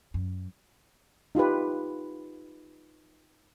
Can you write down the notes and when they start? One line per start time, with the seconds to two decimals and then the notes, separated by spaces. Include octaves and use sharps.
0.14 F#2
1.35 D#4 F4 G4 B4